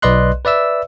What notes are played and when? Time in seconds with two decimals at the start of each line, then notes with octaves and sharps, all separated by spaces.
0.02 B1 B4 D5 D#5 C6 F#6
0.45 B4 D5 E5 E6